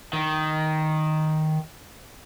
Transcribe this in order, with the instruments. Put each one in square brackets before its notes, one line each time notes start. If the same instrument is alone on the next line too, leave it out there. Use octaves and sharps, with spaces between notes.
[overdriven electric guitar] D#3